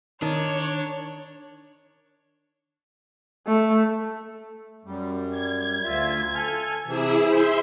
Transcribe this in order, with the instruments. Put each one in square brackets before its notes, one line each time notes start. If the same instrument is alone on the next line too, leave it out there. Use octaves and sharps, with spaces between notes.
[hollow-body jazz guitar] D#3 [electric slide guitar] D4 [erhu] C#5
[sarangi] A3
[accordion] F#2 G3
[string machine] G#6
[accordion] D2 F4 E5
A4 G#5 F6
[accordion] C3 E3 [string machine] E4 G#4 E6
[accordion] C5 [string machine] E5 C6